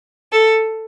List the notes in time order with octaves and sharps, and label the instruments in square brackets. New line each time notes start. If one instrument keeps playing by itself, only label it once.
[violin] A4